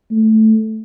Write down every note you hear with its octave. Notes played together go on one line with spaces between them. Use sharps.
A3